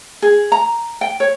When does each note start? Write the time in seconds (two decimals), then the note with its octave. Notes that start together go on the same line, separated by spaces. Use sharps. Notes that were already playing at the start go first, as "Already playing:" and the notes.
0.22 G#4
0.52 A#5
1.01 G5
1.20 C#5